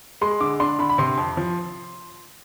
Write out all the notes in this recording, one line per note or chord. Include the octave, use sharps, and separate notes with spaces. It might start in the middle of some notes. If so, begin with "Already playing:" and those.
G#3 C6
D3 D6
D4 C6
D3 B5
B5
C3 C6
F2
F3